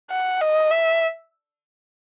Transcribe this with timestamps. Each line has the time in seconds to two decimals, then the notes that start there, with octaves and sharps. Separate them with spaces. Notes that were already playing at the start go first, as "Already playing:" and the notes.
0.10 F#5
0.41 D#5
0.71 E5